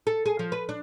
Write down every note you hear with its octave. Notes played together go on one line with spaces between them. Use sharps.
A4
G#4
F3
B4
D4